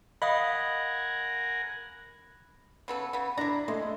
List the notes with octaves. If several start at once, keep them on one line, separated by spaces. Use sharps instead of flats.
A#4 D#5 F5 F#5 G#5 B5 D#6
C#3 B3 A4
C#3 B3
D4 E4 A#5
G#3 A3 D#5